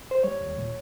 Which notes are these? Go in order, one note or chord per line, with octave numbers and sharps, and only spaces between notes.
C5
G3 C#5
D#2
A#2